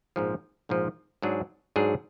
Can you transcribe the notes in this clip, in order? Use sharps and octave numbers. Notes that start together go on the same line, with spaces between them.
A#1 G#2 F3
A#1 G#2 F3
G#2 F#3 D4 G#4
G#2 F#3 D4 G#4